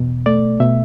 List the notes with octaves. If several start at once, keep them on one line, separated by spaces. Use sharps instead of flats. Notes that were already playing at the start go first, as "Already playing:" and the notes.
Already playing: E2 B2
A3 D5
B2 E5